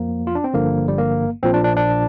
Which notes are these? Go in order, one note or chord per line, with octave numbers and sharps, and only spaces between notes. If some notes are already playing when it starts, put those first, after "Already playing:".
Already playing: F2 F3 A#3
F4
D4
C4
G1 G2 D3 F3 A#3
G3
A#3
A#1 A#2 F3 C4
D4
D4
D4